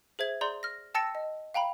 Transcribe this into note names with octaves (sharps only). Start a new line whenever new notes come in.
G#4 C5 E5 G#6
G#4 D5 A#5 C6 G6
F6 A#6
G5 A5 E6 A6 A#6 C#7
D#5
F5 G5 A#5 B5